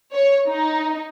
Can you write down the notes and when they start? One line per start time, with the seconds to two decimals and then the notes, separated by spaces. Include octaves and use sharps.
0.13 C#5
0.47 D#4